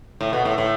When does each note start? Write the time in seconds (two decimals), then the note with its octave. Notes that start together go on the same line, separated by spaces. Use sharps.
0.21 A2
0.33 B2
0.45 A2
0.58 A2